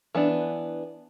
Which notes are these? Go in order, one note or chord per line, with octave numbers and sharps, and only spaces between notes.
E3 B3 D4